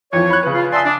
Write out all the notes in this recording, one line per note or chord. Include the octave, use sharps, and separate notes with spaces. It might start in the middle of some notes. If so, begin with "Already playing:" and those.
F2 E3 F3 C#5
B5 F#6
C#3 B4
F4 F5
D5 E5 G#5 A5 C6 D#6
D4